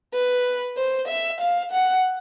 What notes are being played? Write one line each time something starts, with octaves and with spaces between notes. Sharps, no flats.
B4
C5
E5
F5
F#5